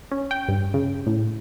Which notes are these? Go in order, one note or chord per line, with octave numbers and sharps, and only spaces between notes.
C#4
G5
G2
C#3
A2